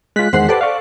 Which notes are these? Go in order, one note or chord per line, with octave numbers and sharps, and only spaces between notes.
G#3 F4 F#6 B6
E2 D#3 G#3 C5 F#5 C7
G4 A4 B4 D5 A5
F5 C#6